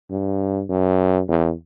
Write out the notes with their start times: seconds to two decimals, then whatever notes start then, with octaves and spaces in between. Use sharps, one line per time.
0.11 G2
0.69 F#2
1.28 E2